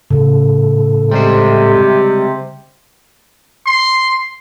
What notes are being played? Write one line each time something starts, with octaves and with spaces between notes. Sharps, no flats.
A2 C#3 A4
C3 G3 G#3 C5
C6